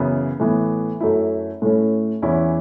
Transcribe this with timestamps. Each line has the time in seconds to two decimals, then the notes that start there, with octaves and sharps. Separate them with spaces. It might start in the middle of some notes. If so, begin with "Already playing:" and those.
Already playing: F#2 C#3 E3 B3 E4
0.40 A2 E3 B3
1.01 F#2 F#3 A3 E4
1.62 A2 A3 C#4 E4
2.22 E2 E3 C#4 E4